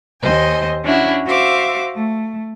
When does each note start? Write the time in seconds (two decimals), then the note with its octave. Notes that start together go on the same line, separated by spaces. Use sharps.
0.21 D#2 C5 D#5 G#5
0.84 C#4 D4 E4 F#4
1.26 F#4 C5 E5 F5 D6
1.95 A3